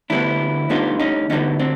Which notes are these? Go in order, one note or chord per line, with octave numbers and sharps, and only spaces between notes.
D2 D3 G3 B3 D4 E4
D2 D3 G3 B3 D#4 F4
C#4 D#4
D2 D3 G3 B3 C#4 D#4
C4 D4